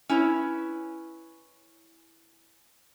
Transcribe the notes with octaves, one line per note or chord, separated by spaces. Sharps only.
C#4 E4 B4 C#5